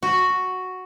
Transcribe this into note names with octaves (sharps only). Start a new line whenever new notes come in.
F#4